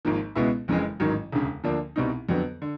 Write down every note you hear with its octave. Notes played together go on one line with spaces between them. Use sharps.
G#1 G#2 F3 A#3
C#2 B2 G#3 B3 E4
F#1 F2 C#3 E3 G#3
A1 G#2 D#3 F#3
E1 D2 C#3
D2 D3 F3 A#3 D4
C2 B2 G3 C4 D#4
F2 D3 F#3 B3
D3